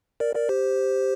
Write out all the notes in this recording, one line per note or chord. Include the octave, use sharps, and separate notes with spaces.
A#4 D5
A#4 D5
G4 C5